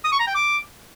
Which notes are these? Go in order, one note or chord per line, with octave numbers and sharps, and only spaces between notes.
D#6
C#6
A#5
G5
D6